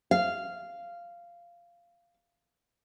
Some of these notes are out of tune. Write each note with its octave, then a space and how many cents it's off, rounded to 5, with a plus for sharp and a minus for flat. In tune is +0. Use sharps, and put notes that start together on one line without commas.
F5 -10